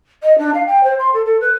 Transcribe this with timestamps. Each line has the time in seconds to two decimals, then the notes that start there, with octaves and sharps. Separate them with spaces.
0.23 D#5
0.38 D4
0.54 F5
0.66 G5
0.83 C5
0.98 C6
1.13 A4
1.25 A4
1.40 B4